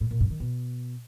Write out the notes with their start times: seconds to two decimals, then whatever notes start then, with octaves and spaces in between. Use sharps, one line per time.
0.01 A2
0.11 A#2
0.21 G2
0.30 D#3
0.40 B2